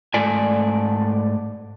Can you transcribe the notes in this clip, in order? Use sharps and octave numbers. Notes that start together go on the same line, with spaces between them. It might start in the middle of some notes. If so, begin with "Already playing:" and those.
G#2 A3 D5 G#5